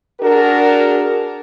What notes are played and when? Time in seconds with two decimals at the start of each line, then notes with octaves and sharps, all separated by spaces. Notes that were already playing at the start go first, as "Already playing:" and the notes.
0.20 D4 F#4 G#4 A#4